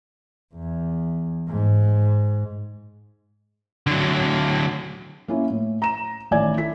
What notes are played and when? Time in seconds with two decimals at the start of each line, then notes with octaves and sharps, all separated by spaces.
0.54 E2
1.48 G#2
3.87 D3 F#3
5.28 A#3 C#4 E4
5.50 A2
5.82 A#5 E7
6.31 A1 D#3 E4 D5 G#5 G#6
6.57 E4 A4 B6